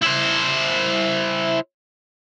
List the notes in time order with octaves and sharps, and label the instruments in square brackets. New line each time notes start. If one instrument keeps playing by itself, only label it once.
[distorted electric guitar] E4 C5